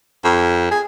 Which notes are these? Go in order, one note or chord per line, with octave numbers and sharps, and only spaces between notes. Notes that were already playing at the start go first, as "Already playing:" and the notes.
F2
G#4